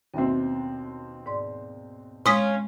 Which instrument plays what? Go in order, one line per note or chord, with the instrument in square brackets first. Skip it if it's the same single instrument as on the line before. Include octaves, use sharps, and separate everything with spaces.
[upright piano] D#2 B2 C4 [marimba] C#4 E5
[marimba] G#2 D5 C6
[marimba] G#3 [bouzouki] C#4 F4 [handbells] C6 D#6 B6